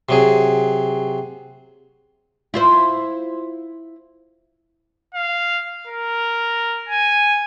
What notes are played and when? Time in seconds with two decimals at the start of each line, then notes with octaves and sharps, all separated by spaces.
0.09 C3 F#3 G#4
2.54 E4 F4 C5
5.14 F5
5.87 A#4
6.89 G#5